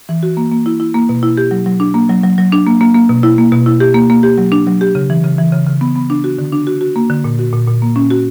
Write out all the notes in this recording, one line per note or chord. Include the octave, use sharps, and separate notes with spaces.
E3
F#4
A#3
A#3
E4
E4
A#3
B2
E4
G4
F#3
F#3
D4
A#3
F#3
F#3
F#3
D4
A#3
A#3
A#3
B2
E4
A#3
B2
E4
G4
A#3
A#3
G4
F#3
D4
F#3
G4
C#3
E3
C#3
E3
C#3
C#3
B3
B3
D4
F#4
D3
D4
F#4
F#4
A#3
D3
A#2
F#4
A#2
A#2
A#3
C#4
F#4